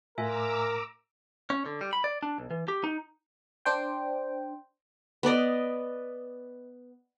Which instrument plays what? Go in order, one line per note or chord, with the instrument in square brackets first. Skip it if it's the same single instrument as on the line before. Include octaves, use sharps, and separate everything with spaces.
[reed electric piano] A2 [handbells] F4 E5 G#5 [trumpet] A#4 [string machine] A#5 D6 E6
[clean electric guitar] C#4
D3
G3
B5
D5
D4
B1
E3
G4
D#4
[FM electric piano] D4 C5 G5
[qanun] B3 B4 D5 D#5